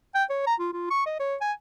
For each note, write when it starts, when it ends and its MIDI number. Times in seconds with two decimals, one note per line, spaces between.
0.15 0.24 79
0.30 0.44 73
0.46 0.54 82
0.59 0.69 65
0.73 0.87 65
0.90 1.04 85
1.06 1.17 75
1.20 1.36 73
1.41 1.52 80